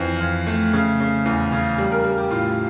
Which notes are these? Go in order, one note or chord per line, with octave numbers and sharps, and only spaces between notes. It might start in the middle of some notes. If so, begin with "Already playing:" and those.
Already playing: F2 E3 F5
F2
A3
C#3
C#3
E2
C#3
G3
A#4
G3 A#4
G4
A2 F4